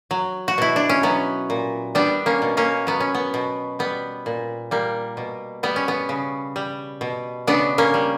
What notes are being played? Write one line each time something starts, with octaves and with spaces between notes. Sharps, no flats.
F#3
F#4
B2 E4
D4
C#4
F#3 B3
A#2
G3 B3 D4
A#3 C#4
B2
A#3 C#4
F#3 B3
C#4
B3
B2
G3 B3
A#2
G3 A#3
B2
G3 B3
C#4
B3
C#3
G3
B2
C#3 B3 D4
A#3 C#4
G3